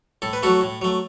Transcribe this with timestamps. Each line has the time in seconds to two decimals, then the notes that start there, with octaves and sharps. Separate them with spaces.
0.22 A2 A4
0.33 B4
0.43 F#3 A3 F#4 A4
0.61 A2
0.82 F#3 A3